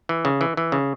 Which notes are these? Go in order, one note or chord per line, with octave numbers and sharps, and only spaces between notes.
E3
C#3
E3
E3
C#3